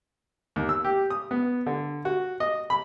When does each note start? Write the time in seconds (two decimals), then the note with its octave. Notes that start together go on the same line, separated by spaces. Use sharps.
0.56 D#2
0.69 E6
0.85 G4
1.10 D#6
1.31 B3
1.66 D3
2.05 F#4
2.40 D#5
2.70 B5